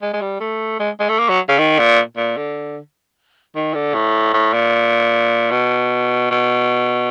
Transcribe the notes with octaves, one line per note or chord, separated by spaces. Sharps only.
G#3
G#3
G3
A3
G#3
G#3
A3
A#3
F#3
C#3
D#3
A#2
A#2
D3
D#3
D3
A2
A2
A#2
B2
B2